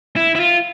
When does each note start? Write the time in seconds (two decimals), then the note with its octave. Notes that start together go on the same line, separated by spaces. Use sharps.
0.16 E4
0.36 E4
0.40 F4